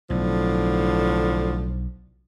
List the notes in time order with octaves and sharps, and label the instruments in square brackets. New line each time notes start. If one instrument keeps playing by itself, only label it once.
[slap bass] B1 [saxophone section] A2 D3 F3